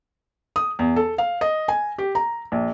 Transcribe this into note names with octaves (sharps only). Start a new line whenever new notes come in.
D#6
E2
A4
F5
D#5
G#5
G4
A#5
A#1